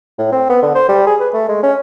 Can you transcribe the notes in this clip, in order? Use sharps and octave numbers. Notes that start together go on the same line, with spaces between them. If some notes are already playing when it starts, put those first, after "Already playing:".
A2
C4
B3
D3
C5
G3
G#4
B4
A3
G#3
C#4